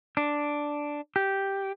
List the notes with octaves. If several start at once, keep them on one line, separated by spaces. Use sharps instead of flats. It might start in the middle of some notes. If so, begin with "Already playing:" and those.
D4
G4